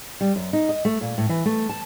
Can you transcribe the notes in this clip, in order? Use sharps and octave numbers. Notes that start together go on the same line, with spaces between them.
G3
F#2
D#4
D#5
A3
A#2
A2
E3
A3
A5